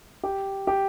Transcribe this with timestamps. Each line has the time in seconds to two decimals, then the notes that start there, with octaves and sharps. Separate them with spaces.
0.23 G4
0.67 G4